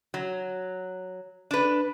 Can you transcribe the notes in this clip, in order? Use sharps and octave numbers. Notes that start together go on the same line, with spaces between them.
F#3
D4 B4